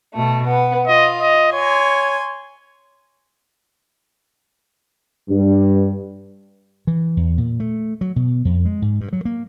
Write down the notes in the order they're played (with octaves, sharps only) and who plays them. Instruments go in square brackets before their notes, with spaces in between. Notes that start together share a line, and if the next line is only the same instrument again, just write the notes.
[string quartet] B2 A3
B3
[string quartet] F4 [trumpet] D#5
[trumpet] D#5
[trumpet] C#5 [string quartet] G#5 C6
[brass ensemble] G2
[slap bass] E3
E2
A#2
A3
F#3
B2
F2
G#3
G#2
G2
F#3
A#3